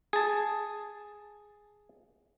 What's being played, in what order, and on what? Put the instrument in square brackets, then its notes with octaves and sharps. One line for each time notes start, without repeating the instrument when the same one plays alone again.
[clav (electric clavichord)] G#4 A5